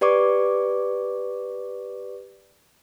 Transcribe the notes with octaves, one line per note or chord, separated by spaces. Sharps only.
G4 B4 D5 C#6 D6